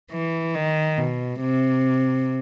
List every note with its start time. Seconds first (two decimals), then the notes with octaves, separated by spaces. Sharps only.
0.12 E3
0.55 D#3
0.98 B2
1.41 C3